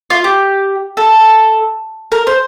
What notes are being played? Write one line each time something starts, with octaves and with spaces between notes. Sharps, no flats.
F4
G4
A4
A#4
C5